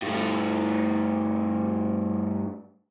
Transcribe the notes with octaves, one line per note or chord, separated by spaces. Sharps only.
G2 A3